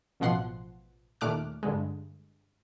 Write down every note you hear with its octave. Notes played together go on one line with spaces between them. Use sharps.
A1 B2 F3 F#5 C6
D#2 A#2 A3 D6 F6 F#6
G2 D3 G#3